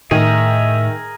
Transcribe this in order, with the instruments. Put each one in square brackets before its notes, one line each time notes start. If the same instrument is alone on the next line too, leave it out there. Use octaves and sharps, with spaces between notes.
[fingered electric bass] A2 [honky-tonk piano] D#3 [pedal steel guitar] G#4 A#4 [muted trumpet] E5